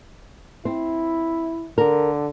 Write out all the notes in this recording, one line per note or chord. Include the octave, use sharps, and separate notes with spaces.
C4 E4
D3 A#4